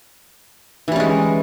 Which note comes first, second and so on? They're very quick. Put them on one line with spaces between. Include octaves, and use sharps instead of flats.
E3 G3 C#4 G#3